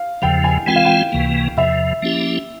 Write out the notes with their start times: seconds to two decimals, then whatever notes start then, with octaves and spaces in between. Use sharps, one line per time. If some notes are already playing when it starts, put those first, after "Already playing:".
Already playing: F5
0.22 E2 C#3 F3 G5
0.44 G#5
0.66 E3 G#3 C4 F4 G5
0.76 F5
0.85 G5
1.12 C#2 C3 E3 A#3
1.57 E2 C3 F3 E5
2.02 F3 A#3 C#4 E4 G4